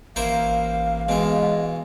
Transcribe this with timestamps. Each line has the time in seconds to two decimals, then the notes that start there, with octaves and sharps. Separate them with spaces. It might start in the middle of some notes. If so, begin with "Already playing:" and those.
0.16 A1 A#3 E4 C5 F5
1.09 B2 E3 G#3